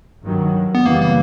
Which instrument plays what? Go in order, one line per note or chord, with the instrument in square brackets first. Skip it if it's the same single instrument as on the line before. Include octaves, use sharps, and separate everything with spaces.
[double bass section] G2 D#3 F#3
[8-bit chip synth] B3
[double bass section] F#2 C#3 E3 G3 [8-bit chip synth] A#3
[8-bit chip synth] A#3